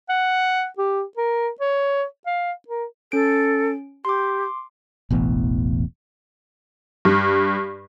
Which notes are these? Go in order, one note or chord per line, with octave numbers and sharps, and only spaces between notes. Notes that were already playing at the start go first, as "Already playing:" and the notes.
F#5
G4
A#4
C#5
F5
A#4
C#4 A4 D7
G4 C6 D6
E1 A1 E2
G2